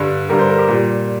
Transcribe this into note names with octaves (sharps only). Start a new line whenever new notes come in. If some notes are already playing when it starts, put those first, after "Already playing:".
Already playing: G2 D3 G3
G2 D3 G3 A#4
C5
A#4
G4
A#2 G3